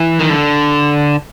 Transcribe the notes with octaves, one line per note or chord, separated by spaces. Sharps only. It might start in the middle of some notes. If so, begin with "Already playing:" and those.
Already playing: E3
D#3
D3